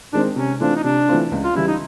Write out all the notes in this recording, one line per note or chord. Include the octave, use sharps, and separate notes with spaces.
D#3 G#3 C4 D4
C3 C#4
E3 A3 C4 D4 F4
D#4
C3 D4
E3 A3 C4 F4
C#2
F4
C#3 E3 G3 E4
D#4